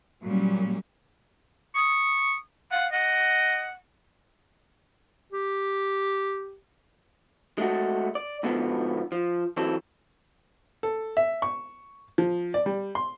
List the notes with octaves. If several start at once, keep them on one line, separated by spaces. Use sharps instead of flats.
A#2 F#3 G3 C#4
C#6 D#6
F5 F#5
D#5 F#5
G4
G#3 A3 F#4
D5
G#2 B2 D3 F3 B3
F3
E3 F#3 C4 A4
A4
E5
C#6
F3
D5
G3
C6